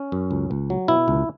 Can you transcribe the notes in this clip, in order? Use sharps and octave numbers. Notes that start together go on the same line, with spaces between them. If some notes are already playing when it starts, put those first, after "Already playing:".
Already playing: C#4
F#2
C#2
C#2
F#3
B2 E4
C#2